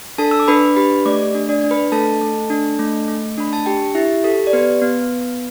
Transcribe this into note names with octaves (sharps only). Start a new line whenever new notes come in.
D4 A4 A5
E6
D6
D4 B4 B5
G4 B4 B5
A3 D5 D6
D4
D4 D5
D4
B4 B5
A3 A4 A5
A3
D4
A3
A3
D4 B5
A5
G4 G5
E4 G4 E5
G4 A4
D5
B3 B4
B3